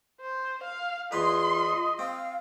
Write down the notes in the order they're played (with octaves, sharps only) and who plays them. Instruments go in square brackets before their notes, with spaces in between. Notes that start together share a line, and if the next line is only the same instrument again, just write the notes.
[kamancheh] C5
F5
[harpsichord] E2 B4 [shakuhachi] F4 [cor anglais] D#5 [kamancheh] C6
[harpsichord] C4 [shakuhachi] F5